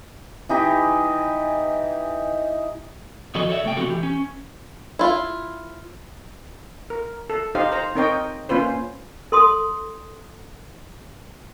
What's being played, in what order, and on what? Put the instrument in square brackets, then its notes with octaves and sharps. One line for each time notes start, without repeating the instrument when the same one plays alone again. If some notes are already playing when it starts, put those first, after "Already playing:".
[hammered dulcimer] E3 D#4 G4
[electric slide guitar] D#3 F3 F#4 A4 C#5 D#5
A4 C#5 D5 E5
C3 A3 G5
C3 F3 F#3 C4 F#4 A4
E3 G4
C#4
[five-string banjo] E4 F4
[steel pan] A#4
A4
D#4 G4 C5 D#5 F5
C5 A#5
C4 D#4 A#4 C#5 D#5 G5
A#3 C#4 F4 B4 C5
[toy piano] A4 C6 D#6